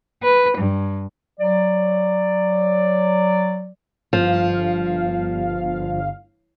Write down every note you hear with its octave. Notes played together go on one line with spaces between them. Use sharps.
B4
G2
F#3 D5
G1 F3 F5